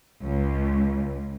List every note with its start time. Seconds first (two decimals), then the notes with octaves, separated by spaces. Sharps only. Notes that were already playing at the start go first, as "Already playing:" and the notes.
0.23 C#2